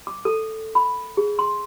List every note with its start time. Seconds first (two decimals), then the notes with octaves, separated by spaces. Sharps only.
0.07 D6
0.25 A4
0.75 B5
1.17 G#4
1.39 C6